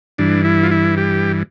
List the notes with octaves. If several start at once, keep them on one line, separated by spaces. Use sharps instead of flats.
G2 E3 D4
E4
F4
E4
G4